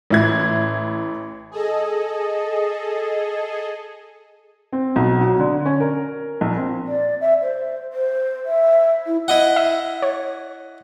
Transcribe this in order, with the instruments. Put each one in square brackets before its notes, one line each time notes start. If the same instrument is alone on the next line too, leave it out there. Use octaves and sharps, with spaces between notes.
[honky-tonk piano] A1 E4 G#6
[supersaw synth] G#4 A4 D#5
[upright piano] C4
B1
F#3
D3
C#4
A#4
A#1
C4
[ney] D5
E5
C5
C5
E5
E4
[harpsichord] E4 D#5 F#5
[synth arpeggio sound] E5
C#5